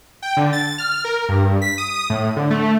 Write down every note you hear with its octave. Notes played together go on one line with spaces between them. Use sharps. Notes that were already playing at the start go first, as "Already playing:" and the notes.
G5
D3
A6
F6
A#4
G2
B6
D#6
A2
D3
A3